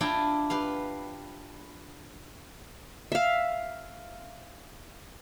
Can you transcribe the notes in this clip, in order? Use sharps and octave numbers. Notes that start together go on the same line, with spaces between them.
D4 E4 F4 G4 G5 A#5
G4 B4 F5
E5 F5